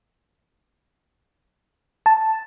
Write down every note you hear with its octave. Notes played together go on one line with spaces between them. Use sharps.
A5